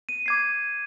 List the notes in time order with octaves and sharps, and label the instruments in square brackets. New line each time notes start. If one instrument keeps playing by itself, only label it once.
[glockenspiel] D#7
D6 G#6 C7